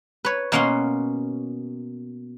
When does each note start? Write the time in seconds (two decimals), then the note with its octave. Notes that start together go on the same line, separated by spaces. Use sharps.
0.25 B4 C#5
0.52 B2 A#3 C#4 F5 F#5 C6